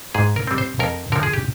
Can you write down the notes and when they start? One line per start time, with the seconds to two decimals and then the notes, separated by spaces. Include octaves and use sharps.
0.15 G#2 G#4
0.36 A#4
0.47 G3 C4
0.58 C5
0.79 F2 A#4
1.12 D3 F3 A#4
1.23 G#4
1.33 G4